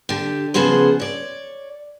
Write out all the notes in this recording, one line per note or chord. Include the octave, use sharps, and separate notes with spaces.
D3 G4
C#3 F3 B3 F#4 G#4 C5
C#5 D5